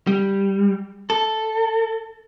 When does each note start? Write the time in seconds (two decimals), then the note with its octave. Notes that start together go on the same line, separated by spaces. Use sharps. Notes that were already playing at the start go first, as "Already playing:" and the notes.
0.07 G3
1.10 A4